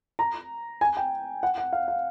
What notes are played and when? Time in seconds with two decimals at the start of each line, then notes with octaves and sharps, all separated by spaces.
0.19 A#5
0.81 G#5
0.97 G5
1.43 F#5
1.58 F#5
1.73 F5
1.88 F5